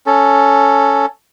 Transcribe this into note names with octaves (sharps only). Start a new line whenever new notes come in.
C#4 A4